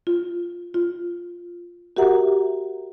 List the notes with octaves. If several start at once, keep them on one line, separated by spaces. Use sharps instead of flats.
F4
F4
F#4 G4 A#4 E5 F#5 A#5